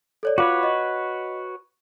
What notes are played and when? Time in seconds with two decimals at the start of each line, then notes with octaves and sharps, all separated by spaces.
0.23 A4 C#5 D5
0.38 F4 F#4 B4 C#5 F5 D6
0.63 D#5